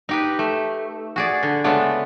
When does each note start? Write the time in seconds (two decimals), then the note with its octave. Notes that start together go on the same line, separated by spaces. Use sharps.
0.09 D#4 G4 B4
0.39 A3
1.16 F#4 G#4 D5
1.43 D3
1.64 C#3 G#3 A3 B3 D4